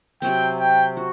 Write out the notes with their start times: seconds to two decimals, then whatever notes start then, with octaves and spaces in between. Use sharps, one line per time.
0.22 C3 F#3 C4 G5
0.59 G5
0.97 F#4